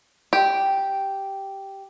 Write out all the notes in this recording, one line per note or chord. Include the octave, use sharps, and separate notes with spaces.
G4